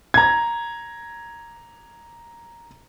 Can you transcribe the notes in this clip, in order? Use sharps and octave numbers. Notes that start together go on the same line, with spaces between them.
A#5 G#6